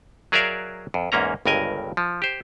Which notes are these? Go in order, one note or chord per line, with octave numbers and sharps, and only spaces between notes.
F#3 G#4 A#4 D5 E5 F5
F2
E2 G#2 A#3 C#4 A#5
G1 C#2 G2 A#4 D#5 G#5
F3
G4 C5